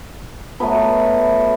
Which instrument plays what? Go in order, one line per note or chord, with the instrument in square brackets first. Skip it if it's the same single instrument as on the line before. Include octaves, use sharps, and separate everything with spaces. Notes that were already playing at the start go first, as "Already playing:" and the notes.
[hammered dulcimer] F#3 A3 B3 B4